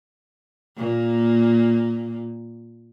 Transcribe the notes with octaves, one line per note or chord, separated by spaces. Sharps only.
A#2 A#3